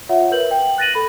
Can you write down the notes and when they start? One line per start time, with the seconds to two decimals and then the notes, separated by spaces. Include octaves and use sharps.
0.09 F4 C#5 E5 F#5
0.31 A#4 B4 G6 F#7
0.51 G5
0.78 F#6 A6 A#6 D#7 F#7
0.95 A4 B5